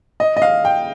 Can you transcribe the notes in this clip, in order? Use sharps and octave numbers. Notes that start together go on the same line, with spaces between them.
D#5
D#5
F5
G5